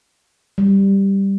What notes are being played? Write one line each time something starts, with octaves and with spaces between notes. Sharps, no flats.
G3